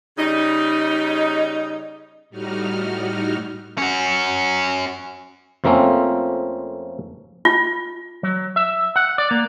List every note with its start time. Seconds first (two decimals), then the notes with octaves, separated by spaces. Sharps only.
0.17 C#3 G3 D#4
2.30 A2 G3 D#4 F#4 F6
3.78 C#4 F#4
5.64 F2 F3 A3 A#3 C4 C#4
7.45 F4
8.23 F#3
8.56 E5
8.96 F#5
9.18 D5
9.31 A#3